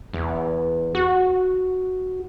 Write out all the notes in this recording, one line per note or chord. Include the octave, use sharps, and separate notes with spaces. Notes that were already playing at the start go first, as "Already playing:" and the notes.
E2
F#4